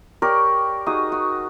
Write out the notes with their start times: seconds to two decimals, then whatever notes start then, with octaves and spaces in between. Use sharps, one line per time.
0.22 G4 A#4 C#5 D5
0.86 D#4 F#4 G#4 D#6
1.12 F#4